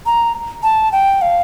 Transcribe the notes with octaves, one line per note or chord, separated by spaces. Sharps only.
A#5
A5
G5
F5